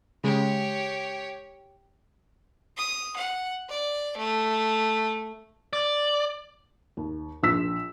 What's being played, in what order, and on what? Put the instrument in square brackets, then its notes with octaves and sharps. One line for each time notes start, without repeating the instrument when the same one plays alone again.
[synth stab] C#3 G#3 [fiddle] G4 C#5
[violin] D#6
F#5
D5
A3
[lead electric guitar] D5
[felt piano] D#2
A#1 F4 E6 B6